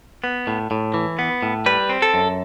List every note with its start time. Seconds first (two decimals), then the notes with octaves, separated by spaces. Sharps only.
0.24 B3
0.47 A2
0.71 A2
0.94 E3
1.19 B3
1.43 A2
1.66 G3 B4
1.89 C4
2.02 A4
2.14 F#2